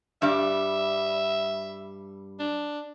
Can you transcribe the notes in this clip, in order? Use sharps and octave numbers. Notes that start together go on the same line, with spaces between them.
G2 G3 E5
D4